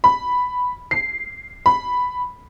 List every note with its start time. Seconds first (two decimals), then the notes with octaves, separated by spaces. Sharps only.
0.04 B5
0.91 C7
1.66 B5